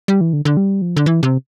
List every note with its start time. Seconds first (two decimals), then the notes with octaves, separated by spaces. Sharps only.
0.08 G3
0.21 E3
0.33 D3
0.45 D3
0.57 G3
0.82 F3
0.97 D3
1.06 E3
1.23 C3